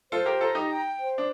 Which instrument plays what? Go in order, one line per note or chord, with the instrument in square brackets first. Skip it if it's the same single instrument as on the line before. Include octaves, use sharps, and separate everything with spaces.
[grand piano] F4 A4 [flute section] C5
[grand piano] G4 A#4
[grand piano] F4 A4 [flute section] A#5
[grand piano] D#4 G4
[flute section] G5
C5
[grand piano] D4